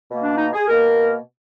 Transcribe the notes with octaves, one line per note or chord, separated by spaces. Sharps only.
B2 A#3
D4
D#4
G#4
B2 A#3 A#4